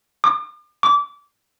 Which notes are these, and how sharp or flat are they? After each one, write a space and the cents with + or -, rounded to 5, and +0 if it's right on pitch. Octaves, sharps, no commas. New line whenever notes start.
D6 +45
D6 -25